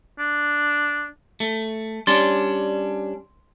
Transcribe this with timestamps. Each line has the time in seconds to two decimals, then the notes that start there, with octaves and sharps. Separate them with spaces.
0.19 D4
1.40 A3
2.07 G3 C#4 D4 C6 A6